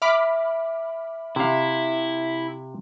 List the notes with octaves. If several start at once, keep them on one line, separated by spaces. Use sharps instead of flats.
E5 B5 D6 F6
C3 E4 F5